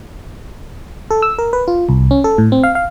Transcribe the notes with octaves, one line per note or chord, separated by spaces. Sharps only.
A4
E6
A#4
B4
F4
C2
C#4
A4
A2
C4
F5
F5